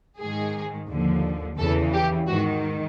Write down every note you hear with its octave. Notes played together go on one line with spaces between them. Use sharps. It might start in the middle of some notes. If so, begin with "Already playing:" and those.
G#2 D#3 G#4
D#2 D3 F3
E2 C#3 E3 A4
G4
G#2 D#3 F#4